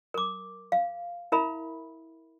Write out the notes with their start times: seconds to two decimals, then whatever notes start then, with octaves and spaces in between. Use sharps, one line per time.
0.14 A#4 D6
0.72 F5
1.32 E4 A#4 E5 B5